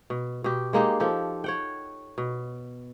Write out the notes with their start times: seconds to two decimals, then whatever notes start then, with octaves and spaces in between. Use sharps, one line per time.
0.10 B2
0.44 B2 G4
0.73 G#3 A#3 D#4 G4
1.00 F3 G4 A4
1.44 C#5 F#5 G5
2.18 B2